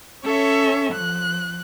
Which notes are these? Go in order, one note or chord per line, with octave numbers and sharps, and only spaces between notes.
C#4 A4 C#5 E5
F3 F#6